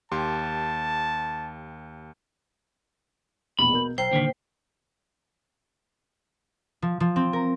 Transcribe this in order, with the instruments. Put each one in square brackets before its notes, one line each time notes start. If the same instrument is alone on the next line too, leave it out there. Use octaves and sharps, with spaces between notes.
[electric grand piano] D#2 G4 C6 [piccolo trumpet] A5
[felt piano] E1 A#1 E2 [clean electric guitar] B5
[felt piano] B2 A#4 G6
[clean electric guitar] B1 [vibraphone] C5 G5 [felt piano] A#5
[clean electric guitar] C2 D3 D#3 [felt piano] A#2 B6
[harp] F3
F3
C4
A#4